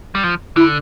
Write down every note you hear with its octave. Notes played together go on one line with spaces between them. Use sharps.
G3
F3
D3 E4